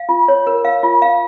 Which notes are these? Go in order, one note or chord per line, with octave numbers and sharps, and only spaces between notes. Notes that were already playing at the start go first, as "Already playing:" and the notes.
Already playing: F5
F4
C#5
A#4
F5
F4
F5